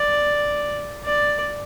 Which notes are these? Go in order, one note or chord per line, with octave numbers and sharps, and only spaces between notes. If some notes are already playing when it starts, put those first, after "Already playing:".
Already playing: D5
D5